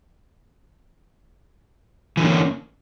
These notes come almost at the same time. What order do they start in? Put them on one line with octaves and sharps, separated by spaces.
E3 D3 A#3 C#4